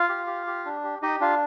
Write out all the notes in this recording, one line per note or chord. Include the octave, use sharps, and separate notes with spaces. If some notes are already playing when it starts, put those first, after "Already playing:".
Already playing: F4 F5
G4
G4
G4
D4
G4
D#4 G4 D#5
D4 F4 F5